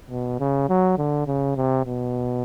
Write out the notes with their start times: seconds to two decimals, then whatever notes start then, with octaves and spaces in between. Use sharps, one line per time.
0.10 B2
0.40 C#3
0.69 F#3
0.98 D3
1.27 C#3
1.56 C3
1.85 B2